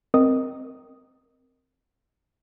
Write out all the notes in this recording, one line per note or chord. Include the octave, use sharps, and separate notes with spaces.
C4 A#4 D#5 D#6